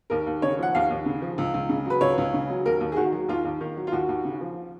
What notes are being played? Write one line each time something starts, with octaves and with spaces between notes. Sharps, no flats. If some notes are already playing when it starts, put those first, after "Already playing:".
D#2 A#4
D#2
C#3 C#5
F3 F#5
D#2 F5
D#2
C#3
F3
C#2
C#2
C#3
F#3 B4
C#2 C#5
C#2
C#3
F#3
D#2 A#4
D#2
G#4
D#3 F#4
F#3
D#2 F4
D#2
D#3
F#3
F4
D#2 F#4
D#2
C#3
F3